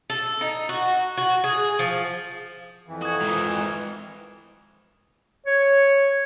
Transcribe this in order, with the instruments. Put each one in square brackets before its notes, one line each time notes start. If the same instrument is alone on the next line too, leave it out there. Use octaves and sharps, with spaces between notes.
[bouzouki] A4
D#4
F#4
F#4
G#4
F3
[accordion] F2 E3
[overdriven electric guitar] F#4 [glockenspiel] D#6 G#6
[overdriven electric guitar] G#2 D#3
[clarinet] C#5